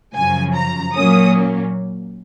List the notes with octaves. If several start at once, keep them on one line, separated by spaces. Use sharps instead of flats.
F#2 C#3 F3 G#5
A#5
A#2 F#3 A#3 C#4 D#6